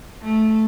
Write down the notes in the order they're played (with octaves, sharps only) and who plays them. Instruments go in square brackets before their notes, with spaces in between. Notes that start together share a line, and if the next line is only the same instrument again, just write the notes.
[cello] A3